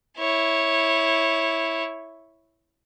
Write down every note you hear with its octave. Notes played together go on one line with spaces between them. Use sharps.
E4 C#5